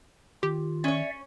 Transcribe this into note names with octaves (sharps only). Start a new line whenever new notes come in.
D#3 F4 G4
C#4 C#5 D5 E5